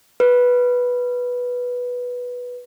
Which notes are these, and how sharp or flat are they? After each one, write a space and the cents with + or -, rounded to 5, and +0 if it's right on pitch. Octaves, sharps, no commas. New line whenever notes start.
B4 -5